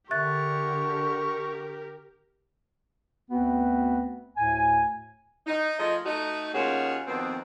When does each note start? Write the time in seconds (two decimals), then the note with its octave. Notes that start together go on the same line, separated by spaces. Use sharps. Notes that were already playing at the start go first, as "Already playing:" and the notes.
0.11 D3 G4 A#4 E5 C#6 F#6 A6
3.30 D2 B3 C4 F#4 B4
4.36 D2 A2 G#5
5.46 D#4
5.79 F3 A3 F4 G#4 D#5
6.05 A3 D#4 F#4
6.54 D#2 C#4 F4 F#4 G#4 A#4
7.07 F2 B2 D#3 B3 C4